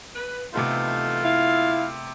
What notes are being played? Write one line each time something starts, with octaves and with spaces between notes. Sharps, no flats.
B4
C3 E3 A3 B3 D#4 F4 A4
E4 F5